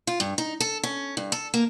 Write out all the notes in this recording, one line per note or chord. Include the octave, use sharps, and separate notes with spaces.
F4
G2
D#4
A4
C#4
G2
A4
A#3